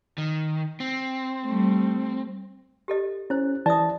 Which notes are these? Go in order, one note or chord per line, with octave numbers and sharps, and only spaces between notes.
D#3
C4
G3 A3
G4 A4 D#5
C#4 E4 C5
E3 D5 E5 A5 D#6